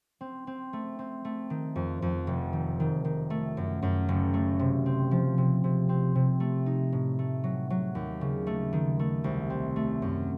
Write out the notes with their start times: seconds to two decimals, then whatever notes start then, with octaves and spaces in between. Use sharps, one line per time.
0.21 C4
0.47 C4
0.73 A3
0.99 C4
1.25 A3
1.50 D#3
1.76 F2
2.02 F2
2.27 F1
2.53 D#3
2.80 D#3
3.05 D#3
3.30 A3
3.57 F#2
3.82 F#2
4.09 F#1
4.34 A3
4.59 C3
4.86 C4
5.11 F3
5.38 C3
5.64 C3
5.89 C4
6.15 C3
6.40 A3
6.66 D#4
6.93 A2
7.19 A3
7.44 F#3
7.70 F#3
7.95 D#2
8.21 C#3
8.47 A3
8.73 D#3
8.99 A3
9.24 C2
9.50 C4
9.76 A3
10.02 F#2